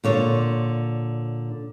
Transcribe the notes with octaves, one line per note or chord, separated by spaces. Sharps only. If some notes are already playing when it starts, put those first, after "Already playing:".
A#2 D3 C#5